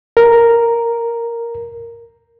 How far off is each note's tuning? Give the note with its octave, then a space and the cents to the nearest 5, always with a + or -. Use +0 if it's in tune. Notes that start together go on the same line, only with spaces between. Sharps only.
A#4 +0